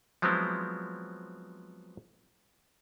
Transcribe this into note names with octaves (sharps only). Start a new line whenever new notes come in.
F3 F#3 G#3 B3 C4 E4